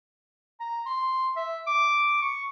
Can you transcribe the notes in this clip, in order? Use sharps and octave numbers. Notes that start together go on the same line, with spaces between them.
A#5
C6
E5
D6
C#6